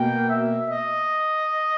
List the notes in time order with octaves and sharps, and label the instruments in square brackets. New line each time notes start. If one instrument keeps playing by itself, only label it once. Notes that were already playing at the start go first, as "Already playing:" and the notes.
Already playing: [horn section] B2 A#3 G5
E5
D#5